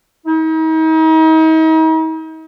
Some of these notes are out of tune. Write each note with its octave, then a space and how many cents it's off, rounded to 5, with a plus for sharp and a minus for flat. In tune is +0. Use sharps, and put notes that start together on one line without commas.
D#4 +40